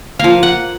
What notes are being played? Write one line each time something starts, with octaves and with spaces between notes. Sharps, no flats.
F3 A#3 F5
F#5